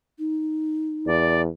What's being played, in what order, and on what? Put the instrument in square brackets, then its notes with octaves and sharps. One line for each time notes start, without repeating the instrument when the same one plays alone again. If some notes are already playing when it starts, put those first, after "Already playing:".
[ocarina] D#4
[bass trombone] E2 [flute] D5